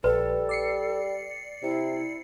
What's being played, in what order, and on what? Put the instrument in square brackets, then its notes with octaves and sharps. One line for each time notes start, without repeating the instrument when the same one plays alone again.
[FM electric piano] A#1 [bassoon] G3 [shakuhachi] A4 [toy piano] B4
[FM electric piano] D5 C7 C#7
[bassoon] C3 [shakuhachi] E4